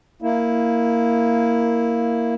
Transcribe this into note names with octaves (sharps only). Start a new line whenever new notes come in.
A#3 E4